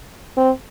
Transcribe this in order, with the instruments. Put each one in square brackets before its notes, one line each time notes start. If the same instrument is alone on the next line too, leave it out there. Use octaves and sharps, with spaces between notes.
[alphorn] C4